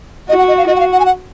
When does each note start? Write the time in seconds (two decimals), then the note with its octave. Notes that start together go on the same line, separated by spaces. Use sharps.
0.29 F#4 D#5
0.38 F#5
0.48 D#5
0.58 F5
0.67 F#4 D#5
0.76 F#5
0.80 F5
0.92 F#5
1.00 G#5
1.05 F#5